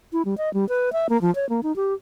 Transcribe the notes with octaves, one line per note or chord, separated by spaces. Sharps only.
E4
G3
D#5
G3
B4
E5
A#3
F3
C#5
A#3
D#4
G4